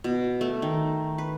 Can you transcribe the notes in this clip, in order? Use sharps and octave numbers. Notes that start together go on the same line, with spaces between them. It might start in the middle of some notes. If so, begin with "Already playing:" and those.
B2
A3
D#3
B4